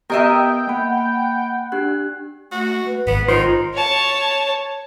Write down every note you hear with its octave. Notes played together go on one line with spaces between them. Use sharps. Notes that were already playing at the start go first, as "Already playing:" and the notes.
B3 G4 A#4 D#5 E5 G5 D#6
A#3 F#5 B5
D4 G4 F#6
A3 F#4
B4
G#1 B3
D#3 F4 C5 A#5
C#5 A5